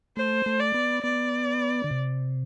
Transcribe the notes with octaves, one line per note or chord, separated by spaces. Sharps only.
A3 C5
A3
D5
B3
B3 D5
D3
C3